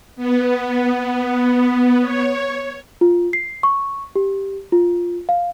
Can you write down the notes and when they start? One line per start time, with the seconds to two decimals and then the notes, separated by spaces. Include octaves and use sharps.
0.16 B3
2.01 C#5
3.01 F4
3.33 C7
3.63 C#6
4.16 G4
4.72 F4
5.29 F5